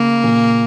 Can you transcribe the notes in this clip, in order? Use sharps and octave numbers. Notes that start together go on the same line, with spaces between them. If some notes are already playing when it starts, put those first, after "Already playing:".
Already playing: C#3 A#3
A#2